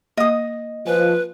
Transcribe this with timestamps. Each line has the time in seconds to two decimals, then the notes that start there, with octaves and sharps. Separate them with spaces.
0.17 A#3 D#5 D#6
0.87 F3 B4 G#5